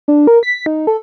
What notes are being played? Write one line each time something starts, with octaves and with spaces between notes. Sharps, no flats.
D4
A#4
B6
D#4
A4